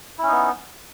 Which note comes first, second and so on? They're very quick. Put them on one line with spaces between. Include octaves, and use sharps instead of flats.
E4 C#4 D#4 B3